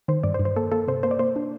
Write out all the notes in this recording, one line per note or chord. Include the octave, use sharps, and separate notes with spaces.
D#3 C5
G2 D5
C5
G2
C5
A#3 A4
A#3 A4
C3 C5
A#3 C5
D5
A#3 C5
D4